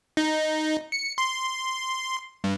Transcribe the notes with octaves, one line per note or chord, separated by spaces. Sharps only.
D#4
C#7
C6
G2